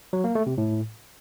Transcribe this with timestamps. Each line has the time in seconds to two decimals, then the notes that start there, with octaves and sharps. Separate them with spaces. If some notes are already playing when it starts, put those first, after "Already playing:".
0.13 F#3
0.24 A#3
0.35 A3
0.46 C3
0.58 A2